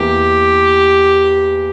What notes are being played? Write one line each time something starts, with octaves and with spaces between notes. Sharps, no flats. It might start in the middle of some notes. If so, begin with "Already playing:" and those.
Already playing: E2 E3 A#3 G4